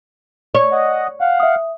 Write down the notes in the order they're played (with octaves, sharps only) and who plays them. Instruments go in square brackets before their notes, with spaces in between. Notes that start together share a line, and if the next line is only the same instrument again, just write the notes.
[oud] C#5 [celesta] D5
[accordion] D#5 F#5
F5 F#5
[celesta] E5 D#6